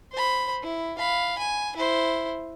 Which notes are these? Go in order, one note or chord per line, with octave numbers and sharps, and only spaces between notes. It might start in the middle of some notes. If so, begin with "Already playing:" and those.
C5 B5
E4
F5 B5
G#5
E4 C5